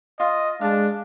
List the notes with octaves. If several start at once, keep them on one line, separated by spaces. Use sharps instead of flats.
F4 D#5 F5
G#3 D4 F5 A5